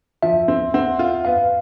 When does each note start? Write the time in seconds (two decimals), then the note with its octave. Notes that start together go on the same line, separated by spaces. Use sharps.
0.23 F3 E5
0.48 C4
0.74 C4 F#5
0.99 F4
1.25 B3 F5